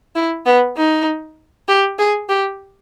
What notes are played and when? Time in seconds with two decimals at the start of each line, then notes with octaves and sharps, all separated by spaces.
0.16 E4
0.46 B3
0.77 D#4
1.68 G4
1.99 G#4
2.29 G4